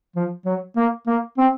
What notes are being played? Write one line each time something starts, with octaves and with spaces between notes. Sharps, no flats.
F3
F#3
A#3
A#3
C4